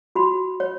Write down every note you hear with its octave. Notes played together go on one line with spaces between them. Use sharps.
F#4 B5
C#5